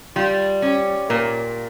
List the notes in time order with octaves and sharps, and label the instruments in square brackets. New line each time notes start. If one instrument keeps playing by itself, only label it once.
[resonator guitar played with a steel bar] G3 [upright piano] F4
[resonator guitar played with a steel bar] C#4 [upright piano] G4
[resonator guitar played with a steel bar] A#2 [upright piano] A#4